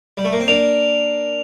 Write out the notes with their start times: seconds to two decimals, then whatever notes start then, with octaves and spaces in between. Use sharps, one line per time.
0.17 G3
0.25 A3
0.32 A#3
0.40 C4
0.48 A#3 D4 F7